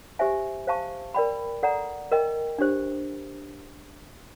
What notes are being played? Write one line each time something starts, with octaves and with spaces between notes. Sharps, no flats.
G4 C5 E5 G#5
C5 F5 A5 C#6
A#4 D5 G5 B5
A4 D5 F#5 A#5
A#4 D#5 G5
D4 G4 C5